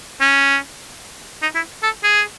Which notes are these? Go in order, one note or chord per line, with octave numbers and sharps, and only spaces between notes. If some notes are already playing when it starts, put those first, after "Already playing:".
C#4
D#4
E4
A4
G#4